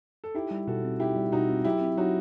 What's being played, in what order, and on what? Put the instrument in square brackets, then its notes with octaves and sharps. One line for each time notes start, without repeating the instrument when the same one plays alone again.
[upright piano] A4
[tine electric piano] D#4 [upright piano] E4 G4
[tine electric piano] G3
[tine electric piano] B2 [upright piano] F#4 A4
[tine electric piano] C4
[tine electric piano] D#4 [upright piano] E4 G4
[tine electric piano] G3
[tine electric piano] B2 [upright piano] D#4 F#4
[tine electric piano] C4
[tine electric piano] F#3 [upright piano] E4 G4
[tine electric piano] C4
[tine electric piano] F#3 [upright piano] D#4 F#4